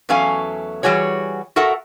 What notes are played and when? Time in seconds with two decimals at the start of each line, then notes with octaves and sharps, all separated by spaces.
0.09 E2 F#3 A3 C#4 F5 G#5
0.83 E3 G3 F#4 G#4 C#5
1.56 F#4 A4 A#4 E5 F#5